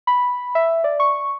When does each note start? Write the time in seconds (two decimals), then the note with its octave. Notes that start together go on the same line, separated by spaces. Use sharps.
0.07 B5
0.55 E5
0.84 D5
1.00 C#6